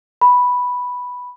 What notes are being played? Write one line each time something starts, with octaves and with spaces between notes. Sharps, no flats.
B5